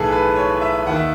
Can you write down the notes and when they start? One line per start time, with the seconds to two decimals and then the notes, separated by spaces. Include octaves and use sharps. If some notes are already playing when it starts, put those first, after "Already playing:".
Already playing: B1 A2 E3 G#4 A4 B4
0.12 B4
0.36 C#5
0.61 E5
0.86 D#2 D#3 F#5
0.96 E5